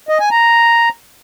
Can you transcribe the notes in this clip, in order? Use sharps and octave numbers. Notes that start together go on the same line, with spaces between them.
D#5
G#5
A#5